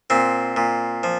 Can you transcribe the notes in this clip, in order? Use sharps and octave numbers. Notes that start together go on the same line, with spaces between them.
A#2 C4
A#2
F3